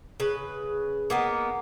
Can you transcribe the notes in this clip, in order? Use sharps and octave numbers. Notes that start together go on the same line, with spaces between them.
C#3 B4
A#3 B3 D#4